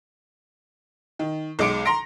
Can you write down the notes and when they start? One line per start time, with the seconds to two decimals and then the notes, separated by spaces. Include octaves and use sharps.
1.19 D#3
1.59 B1 G#3 D6 C#7 D7
1.85 A#5 C6 A#6 D7